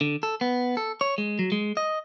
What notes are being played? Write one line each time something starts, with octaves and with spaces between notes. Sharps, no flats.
D3
A4
B3
A4
C#5
G#3
F#3
G#3
D#5